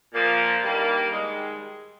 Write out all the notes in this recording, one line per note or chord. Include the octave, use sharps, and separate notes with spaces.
A#2 F3 A#3
G2 D#3 G3 A#3
G#2 D#3 G3 G#3